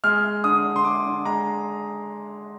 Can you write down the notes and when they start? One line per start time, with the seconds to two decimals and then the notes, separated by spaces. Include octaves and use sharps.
0.04 G#3 F6
0.24 G#3
0.44 D3 D#6
0.64 D3
0.76 C6
0.84 G#3 D6
1.06 D3
1.25 G#3 A#5